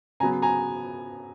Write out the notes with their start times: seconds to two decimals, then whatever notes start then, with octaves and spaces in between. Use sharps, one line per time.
0.20 C#3 F#3 B3 G#5 A#5
0.42 G#5 A#5